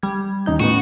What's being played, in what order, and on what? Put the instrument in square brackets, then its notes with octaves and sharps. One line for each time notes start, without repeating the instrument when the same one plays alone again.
[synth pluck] G3 G#6
[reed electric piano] D#2 D#4 G6 [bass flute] C#4
[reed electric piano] A2 B3 [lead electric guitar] F#4